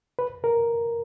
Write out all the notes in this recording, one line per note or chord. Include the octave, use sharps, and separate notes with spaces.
B4
A#4